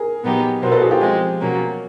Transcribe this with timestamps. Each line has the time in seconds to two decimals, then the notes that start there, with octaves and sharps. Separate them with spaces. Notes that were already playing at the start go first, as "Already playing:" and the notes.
Already playing: G#4 A#4
0.24 A#2 F#3 B3 D#4 G4
0.62 B2 F#3 B3 D#4 A#4 C5
0.72 A4 B4
0.81 F#4 G#4
0.91 F4 G4
1.01 F3 G#3 C4
1.40 B2 F#3 A#3 C#4